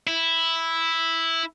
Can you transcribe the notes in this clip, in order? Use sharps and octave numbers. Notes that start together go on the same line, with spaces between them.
E4